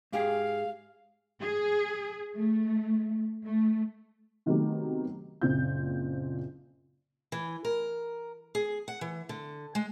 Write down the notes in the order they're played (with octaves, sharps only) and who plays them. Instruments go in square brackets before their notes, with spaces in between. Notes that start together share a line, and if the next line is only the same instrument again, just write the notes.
[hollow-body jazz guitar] G#2 G4 G#4 [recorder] F5
[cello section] G#4
A3
A3
[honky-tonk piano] C3 D#3 F#3 A3 B3 G4
F#1 A#2 C#3 C4 F4 G6
[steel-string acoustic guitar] E3
A#4
G#4
F#5
E3
D3
G#3